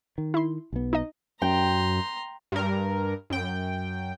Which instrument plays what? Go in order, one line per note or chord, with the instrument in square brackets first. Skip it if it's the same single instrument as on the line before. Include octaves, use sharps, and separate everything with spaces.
[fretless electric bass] D#3
[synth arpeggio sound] E4 C6
[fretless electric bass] B1 B3
[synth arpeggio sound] D#4 D#5
[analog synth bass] F#2 [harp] G5 [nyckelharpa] A#5 C6
[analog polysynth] G2 A#4
F#2 G5